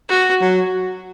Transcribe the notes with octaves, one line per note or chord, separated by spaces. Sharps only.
F#4
F#3